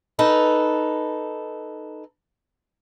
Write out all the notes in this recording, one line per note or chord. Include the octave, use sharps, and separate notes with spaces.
D#4 A4 B4